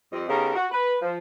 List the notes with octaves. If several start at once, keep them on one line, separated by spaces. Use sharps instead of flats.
F2 G3 C4 D#5
C#3 B3 D#4 G4 A4 A#4
F#4
B4
F3